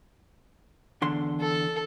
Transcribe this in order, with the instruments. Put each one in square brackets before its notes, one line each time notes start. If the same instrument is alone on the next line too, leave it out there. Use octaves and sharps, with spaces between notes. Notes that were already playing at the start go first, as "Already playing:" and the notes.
[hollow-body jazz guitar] E2 D3 C6
[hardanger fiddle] A4